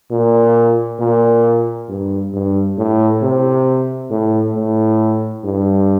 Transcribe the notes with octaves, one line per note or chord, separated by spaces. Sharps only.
A#2
A#2
G2
G2
A2
C3
A2
A2
G2